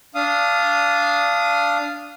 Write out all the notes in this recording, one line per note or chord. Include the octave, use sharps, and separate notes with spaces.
D4 F5 D#6